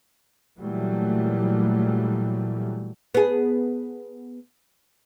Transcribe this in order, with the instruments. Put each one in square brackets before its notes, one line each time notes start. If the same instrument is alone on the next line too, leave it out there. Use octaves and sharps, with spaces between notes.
[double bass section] A#2 E3 F#3 G3 A3
[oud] B3 G#4